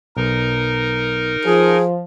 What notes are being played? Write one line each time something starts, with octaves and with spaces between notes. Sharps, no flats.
B1 D#4 A#4
F3 G#4